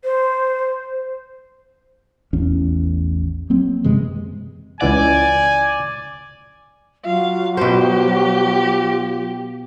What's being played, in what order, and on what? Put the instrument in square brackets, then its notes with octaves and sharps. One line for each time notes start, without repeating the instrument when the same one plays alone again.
[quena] C5
[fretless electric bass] A1 E2 C#4
F#3 A#3 C4
F#2 C3 E3 G#3
[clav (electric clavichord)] C#2 E3 F#5 [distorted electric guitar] D5 [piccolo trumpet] G#5
[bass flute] F#3 [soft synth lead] F4 [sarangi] F5
[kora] B2 C5 [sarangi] G4